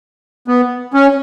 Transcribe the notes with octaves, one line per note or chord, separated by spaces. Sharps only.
B3
C#4